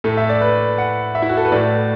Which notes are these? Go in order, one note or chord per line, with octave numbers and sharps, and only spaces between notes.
A2 A3 A4
E5
D5
B4
F#5
E5
E4
F#4
A4
B4
A2 A3 D5